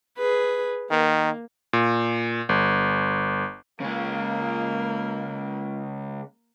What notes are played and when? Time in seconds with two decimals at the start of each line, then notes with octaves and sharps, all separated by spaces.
0.18 G#4 B4
0.90 D#3 A#3
1.73 A#2
2.49 G1
3.80 C#3 G#3 A#3